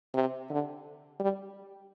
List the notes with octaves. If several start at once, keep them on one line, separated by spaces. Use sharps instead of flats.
C3
D3
G3